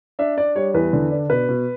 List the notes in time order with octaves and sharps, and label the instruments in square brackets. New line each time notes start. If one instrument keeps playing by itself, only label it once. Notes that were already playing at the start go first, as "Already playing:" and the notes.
[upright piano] D4 E5
D4 D5
G3 C#5
E2 B4
D3
D4
B2 B4
B2